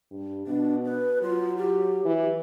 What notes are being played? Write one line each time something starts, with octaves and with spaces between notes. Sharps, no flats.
G2
B2 D4
B4
F#3 F4
G4
E3